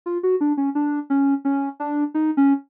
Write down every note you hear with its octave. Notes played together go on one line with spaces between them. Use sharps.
F4
F#4
D4
C#4
D4
C#4
C#4
D4
D#4
C#4